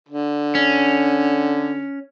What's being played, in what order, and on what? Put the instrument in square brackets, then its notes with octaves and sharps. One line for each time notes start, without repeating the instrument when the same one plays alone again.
[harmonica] D3
[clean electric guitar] C#4